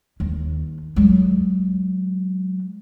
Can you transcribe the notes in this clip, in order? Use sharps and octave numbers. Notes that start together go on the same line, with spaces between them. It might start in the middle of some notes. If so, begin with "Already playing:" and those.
D#2
F#3 G#3